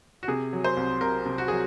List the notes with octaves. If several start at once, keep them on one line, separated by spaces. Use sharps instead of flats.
F#4
C3 G#4
F#3
C5
C2
C2 A#4
C3
F#4
F#3 G#4